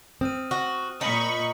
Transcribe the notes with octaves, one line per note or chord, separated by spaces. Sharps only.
C4 D#6 F6 D#7
F#4 C#6
A#2 D#4 B5 C#6 D#6 C#7 F#7